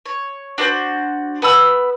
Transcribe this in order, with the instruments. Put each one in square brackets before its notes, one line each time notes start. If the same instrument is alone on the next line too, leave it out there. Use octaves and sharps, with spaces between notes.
[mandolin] C#5
D4 F#4 B4 C5
B3 B5 E6